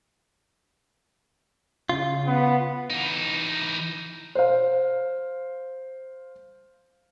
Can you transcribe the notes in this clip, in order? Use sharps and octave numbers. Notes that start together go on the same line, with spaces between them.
C#3 F4
B3
E3 D#4
C5 F5